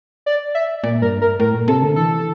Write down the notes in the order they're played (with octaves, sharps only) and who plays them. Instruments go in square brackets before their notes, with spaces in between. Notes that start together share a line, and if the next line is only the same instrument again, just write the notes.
[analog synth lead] D5
E5
[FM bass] A#2 [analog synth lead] D5
[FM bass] G2 [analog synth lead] A#4
[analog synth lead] A#4
[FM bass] A2 [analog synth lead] A#4
[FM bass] A#2
[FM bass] C3 [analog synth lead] A4
[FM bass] D3
[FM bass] E3 [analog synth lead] A4